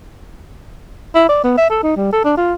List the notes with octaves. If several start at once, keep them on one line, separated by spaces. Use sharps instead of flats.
E4
D5
B3
E5
A4
D#4
G3
A4
D4
F4